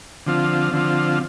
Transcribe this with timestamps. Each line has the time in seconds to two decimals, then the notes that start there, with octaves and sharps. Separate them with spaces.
0.26 D3 F3 C4 F4
0.73 D3 F3 C4 F4